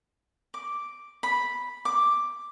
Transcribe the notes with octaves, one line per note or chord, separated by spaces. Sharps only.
D6
B5
D6